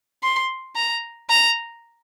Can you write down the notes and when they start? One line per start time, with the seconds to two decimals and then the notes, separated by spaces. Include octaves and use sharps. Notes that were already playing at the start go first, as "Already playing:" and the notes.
0.23 C6
0.76 A#5
1.29 A#5